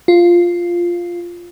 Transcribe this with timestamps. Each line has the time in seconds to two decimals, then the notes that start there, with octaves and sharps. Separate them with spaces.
0.08 F4